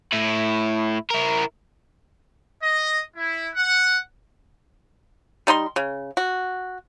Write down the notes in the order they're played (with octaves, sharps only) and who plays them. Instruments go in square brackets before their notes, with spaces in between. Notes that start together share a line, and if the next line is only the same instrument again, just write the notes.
[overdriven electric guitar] A2 E4
E4 A#4
[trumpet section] D#5
E4
F#5
[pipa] G3 D#4 C5 C6
C#3
F#4